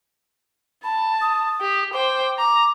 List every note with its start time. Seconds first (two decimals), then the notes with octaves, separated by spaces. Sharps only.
0.84 A5 B5
1.21 D#6
1.60 G4
1.93 C5 G5 D6
2.38 A#5 D6